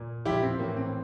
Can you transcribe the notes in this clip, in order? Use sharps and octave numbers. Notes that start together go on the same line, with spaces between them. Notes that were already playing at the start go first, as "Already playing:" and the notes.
Already playing: A#2
A#2 F3 E4 G4
C4
A2 E3 A#3
C4